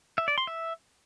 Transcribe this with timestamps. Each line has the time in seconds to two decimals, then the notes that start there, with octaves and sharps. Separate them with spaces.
0.18 E5
0.28 D5
0.38 C6
0.47 E5